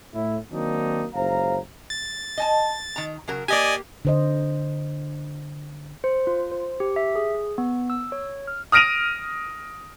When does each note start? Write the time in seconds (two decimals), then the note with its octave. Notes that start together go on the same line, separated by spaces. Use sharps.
0.14 A2 E4
0.51 D#3 F#3 A#3 C4 D4 D#4
1.14 F#1 C#2 C5 F5 A#5
1.90 A6
2.38 D#5 G#5 A5
2.96 D#3 A#5
3.28 C#3 F#3 A#4
3.48 A#3 G4 D5 D#5 G#5
4.05 D3 C5 D#5
6.04 C5
6.27 F4
6.52 C5
6.80 G4
6.96 E5
7.16 G#4
7.58 B3
7.90 E6
8.12 C#5
8.48 F6
8.72 D#6 F6 A#6 D7 D#7 F7